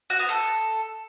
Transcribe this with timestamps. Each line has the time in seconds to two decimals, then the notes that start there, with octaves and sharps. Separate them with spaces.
0.10 F#4
0.19 B3
0.29 A4